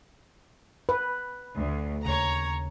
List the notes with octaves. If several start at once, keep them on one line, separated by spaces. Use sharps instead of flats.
B4
D2
D#2 C#3 C#5 A#5